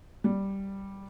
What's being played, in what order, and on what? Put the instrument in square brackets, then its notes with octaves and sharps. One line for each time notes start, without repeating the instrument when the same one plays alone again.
[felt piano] G3